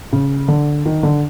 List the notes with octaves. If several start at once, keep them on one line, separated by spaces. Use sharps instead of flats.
C#3
D3
D#3
D3